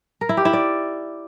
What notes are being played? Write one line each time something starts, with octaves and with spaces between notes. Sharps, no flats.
A#4
E4
G4
E4
D5